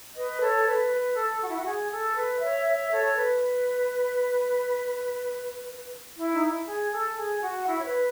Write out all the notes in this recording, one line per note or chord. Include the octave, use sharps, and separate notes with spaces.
B4 D#5
A4 C#5
B4
B4
A4
F#4
E4
F#4
G#4
A4
B4
C#5 E5
C#5 E5
A4 C#5
B4
E4
D#4
E4
G#4
A4
G#4
F#4
E4
C#5
B4